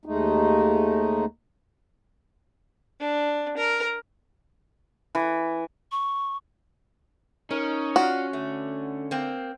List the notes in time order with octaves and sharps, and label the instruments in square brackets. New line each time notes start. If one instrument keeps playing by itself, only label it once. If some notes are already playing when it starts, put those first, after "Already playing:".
[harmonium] D#2 G#3 A3 D#4
[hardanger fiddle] D4
A#4
[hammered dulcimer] E3
[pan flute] C#6
[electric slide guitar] C#4 [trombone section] D#4 [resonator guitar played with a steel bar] A#4
[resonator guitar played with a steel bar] F4 D5 F#5 [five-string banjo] F#4
[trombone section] D3 [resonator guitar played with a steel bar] A3
[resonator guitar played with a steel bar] A#3 C4